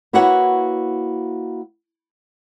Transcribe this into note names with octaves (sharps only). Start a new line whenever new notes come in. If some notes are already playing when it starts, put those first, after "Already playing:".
A#3 E4 F#4 B4 C#5 F#5